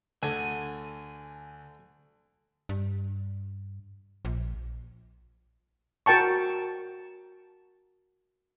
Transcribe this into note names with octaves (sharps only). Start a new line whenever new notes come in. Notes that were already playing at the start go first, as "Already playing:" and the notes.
D2 D3 G#5
G2
A#1
F#4 A#4 G5 A5 C#6